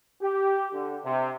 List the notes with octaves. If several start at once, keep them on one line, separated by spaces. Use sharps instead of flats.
G4
D3
C3